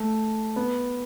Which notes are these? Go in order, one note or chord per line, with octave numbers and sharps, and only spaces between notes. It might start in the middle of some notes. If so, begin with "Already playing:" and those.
Already playing: A3
B3